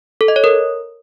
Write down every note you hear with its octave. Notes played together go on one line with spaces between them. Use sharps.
A4
D#5
C#5
A#4